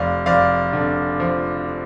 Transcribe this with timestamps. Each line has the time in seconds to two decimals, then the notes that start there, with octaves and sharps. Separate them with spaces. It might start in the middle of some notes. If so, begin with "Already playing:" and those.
Already playing: F1 D5 F5
0.26 F1 D5 F5
0.73 D3
1.20 F3